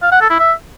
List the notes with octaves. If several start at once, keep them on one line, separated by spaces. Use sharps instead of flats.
F5
F#5
A4
E4
E5